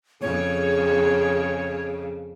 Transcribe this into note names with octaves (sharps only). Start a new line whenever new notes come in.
F2 C#3 G#4 C#5